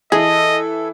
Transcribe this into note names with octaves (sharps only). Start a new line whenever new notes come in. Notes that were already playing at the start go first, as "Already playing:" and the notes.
E3 E4 G#4 A4 D#5